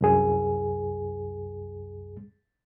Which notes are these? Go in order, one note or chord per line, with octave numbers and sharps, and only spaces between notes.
C2 F#2 G#4